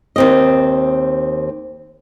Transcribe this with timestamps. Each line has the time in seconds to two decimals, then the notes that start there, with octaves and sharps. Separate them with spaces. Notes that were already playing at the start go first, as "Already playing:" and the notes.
0.16 D#2 C4 D#5